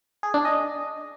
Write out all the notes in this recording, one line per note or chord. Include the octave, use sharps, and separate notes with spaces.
G#4
D4
D#5